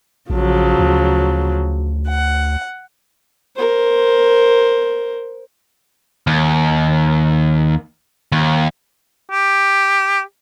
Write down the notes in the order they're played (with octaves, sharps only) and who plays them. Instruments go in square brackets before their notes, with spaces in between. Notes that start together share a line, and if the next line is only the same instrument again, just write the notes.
[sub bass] A#1 [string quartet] C#3 F3 F#3
[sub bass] D2
[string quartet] F#5
[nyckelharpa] A#4 C5
[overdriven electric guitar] D#2
D#2
[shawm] G4